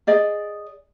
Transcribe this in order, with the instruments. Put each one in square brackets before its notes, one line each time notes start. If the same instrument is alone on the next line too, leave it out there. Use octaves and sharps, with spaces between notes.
[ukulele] G#4 D5 D#5